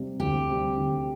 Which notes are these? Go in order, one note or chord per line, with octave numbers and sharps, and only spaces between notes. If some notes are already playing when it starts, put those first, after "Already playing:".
Already playing: C3 G3
D2 G4
C3 G3
D2